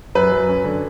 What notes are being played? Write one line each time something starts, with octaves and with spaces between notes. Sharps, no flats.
F#2 B4
F#3
C#4
D3